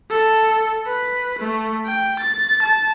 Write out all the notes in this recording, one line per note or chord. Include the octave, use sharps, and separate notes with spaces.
A4
B4
A3
G5
A6
A5